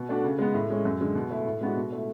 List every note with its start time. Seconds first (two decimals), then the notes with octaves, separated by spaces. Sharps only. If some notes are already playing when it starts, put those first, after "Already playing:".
Already playing: B2
0.09 A3 D4 F#4
0.24 C#3
0.39 G#3 B3
0.54 A2
0.70 G#3 C#4
0.85 F#2
1.01 D3 G#3
1.15 B2
1.31 A3 E4
1.46 A2
1.61 G#3 B3 D4 F#4
1.76 B2
1.92 A3 E4